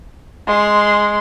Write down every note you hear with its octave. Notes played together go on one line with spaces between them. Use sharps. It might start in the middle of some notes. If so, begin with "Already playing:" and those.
G#3 C6